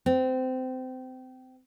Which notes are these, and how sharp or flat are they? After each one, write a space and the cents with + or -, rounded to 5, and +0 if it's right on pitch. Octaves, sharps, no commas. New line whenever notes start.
C4 -25